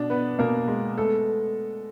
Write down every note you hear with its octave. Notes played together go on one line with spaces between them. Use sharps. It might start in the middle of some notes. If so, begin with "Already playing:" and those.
Already playing: B2 D4
B3 B4
B2 A#3 A#4
G#3
A3 B3 A4